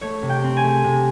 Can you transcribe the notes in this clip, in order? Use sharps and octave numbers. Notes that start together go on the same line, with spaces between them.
A3 C#5
C3
G5
C4
G#5
A3
C3